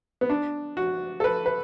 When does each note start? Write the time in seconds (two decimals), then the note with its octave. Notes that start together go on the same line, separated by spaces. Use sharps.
0.21 B3
0.30 D4
0.77 F#4
1.20 A4
1.24 B4
1.46 B4